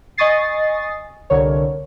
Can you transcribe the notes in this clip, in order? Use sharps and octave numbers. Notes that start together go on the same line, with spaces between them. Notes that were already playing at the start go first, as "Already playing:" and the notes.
D#5 G#5 C#6 D#6 A6 C7
C2 D3 A#4 C#5